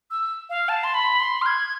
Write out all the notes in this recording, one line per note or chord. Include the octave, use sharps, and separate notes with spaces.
E6
F5
A5
C6
B5
C6
F6
G#6